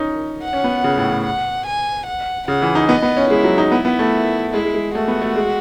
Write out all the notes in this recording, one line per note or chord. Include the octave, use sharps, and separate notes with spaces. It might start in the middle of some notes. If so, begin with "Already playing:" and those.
Already playing: C#4 D#4
F#5
C#4
B3
C#3
A2
A2
F#5
G#5
F#5
C#3 F#5
E3
D#4
B3 D#5
B3
C#4
G#3 E4
F#3
D#4
B3 E4
B3
A3
G#3 E4
G#3
G#3
A3 F#4
B3
A3
G#3